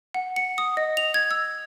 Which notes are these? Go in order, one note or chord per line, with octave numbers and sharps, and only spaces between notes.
F#5
C#7
D#6
D#5
F7
G#6
E6